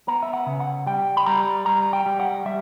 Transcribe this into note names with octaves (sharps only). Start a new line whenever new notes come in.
B3 A#5
E5
F#5
C#3
F#5
G3 G5
B5
G3 A#5
G3 A#5
G5
G3
F#5
G3 E5